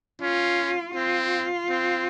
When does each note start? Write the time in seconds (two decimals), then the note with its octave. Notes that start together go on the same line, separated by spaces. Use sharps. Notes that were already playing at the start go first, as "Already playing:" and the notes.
0.22 C#4 F4
0.95 C4 F4
1.69 C4